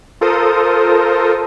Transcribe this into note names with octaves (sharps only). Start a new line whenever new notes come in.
F4 A4 A#4 C5 D#6